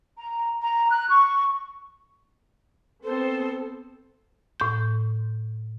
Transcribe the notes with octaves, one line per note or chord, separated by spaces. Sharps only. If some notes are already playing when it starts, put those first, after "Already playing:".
A#5
A#5
F#6
C#6
B3 C4 A4 C5
A2 C6 G6